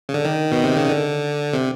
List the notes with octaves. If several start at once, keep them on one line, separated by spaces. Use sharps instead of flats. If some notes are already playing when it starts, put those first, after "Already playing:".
C#3
D3
D#3
B2
C3
C#3
D3
C3